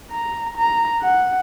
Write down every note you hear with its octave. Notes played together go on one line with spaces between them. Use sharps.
A#5
A#5
F#5